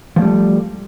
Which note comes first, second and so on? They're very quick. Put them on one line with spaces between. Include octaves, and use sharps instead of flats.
F3 A#3 G3 A3